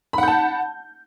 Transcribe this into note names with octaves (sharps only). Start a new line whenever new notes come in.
F#5 A5 B5 G6